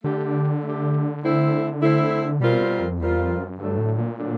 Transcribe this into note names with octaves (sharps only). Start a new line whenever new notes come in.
D3 A3 D4 G4
A3 D4 G4
A3 C4 E4
A3 C4 E4
B2 G3 C4 F4 A#4
B2
F2
E2 G3 C4 F4 A#4
F2
F#2
G2 D3 F#3 A3 D4
A2
A#2
D3 F#3 A3 D4